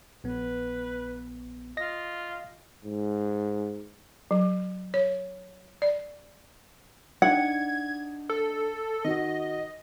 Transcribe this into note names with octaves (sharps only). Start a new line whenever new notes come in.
A#1 B3 B4
F4 D#5 A#6
G#2
F#3
C#5
D5
D4 D#4 F#5 G#6
A4
D#3 F#4 D#5